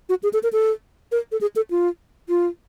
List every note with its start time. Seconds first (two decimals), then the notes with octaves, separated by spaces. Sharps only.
0.09 F#4
0.23 G#4
0.33 A4
0.43 A#4
0.53 A4
1.12 A#4
1.32 A4
1.41 G#4
1.56 A4
1.71 F4
2.29 F4